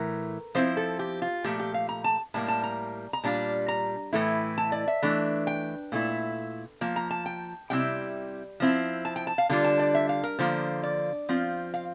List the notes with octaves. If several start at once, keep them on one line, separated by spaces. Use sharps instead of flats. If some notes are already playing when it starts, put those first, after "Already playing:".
Already playing: A2 E3 A3 A#4
F3 C4 E4 C5
A4
G4
F4
A#2 F3 A3 G4
G4
F5
A#5
A5
A2 G3 A#3 A5
A5
A#5
A#5
A#2 G3 D4 F4 A5
A#5
A2 E3 A3 E4
A5
D5
E5
E3 A3 D4
G5
A#2 A3 E4
F3 A#3
A#5
A5
G5
C3 G3 C4 E4 G5
F3 C4 E4
A5
G5
A5
F5
D3 G3 D4 F4 F5
A5
D5
E5
F5
A#4
D3 F3 A#3 F4 C5
D5
F3 C4 F4
F5